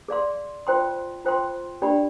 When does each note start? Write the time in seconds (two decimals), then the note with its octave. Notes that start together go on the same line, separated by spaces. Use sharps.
0.08 G#4 D5 F5 C6
0.67 F4 C5 G5 C6
1.25 F4 C5 G5 C6
1.82 D4 G4 D5 G5 B5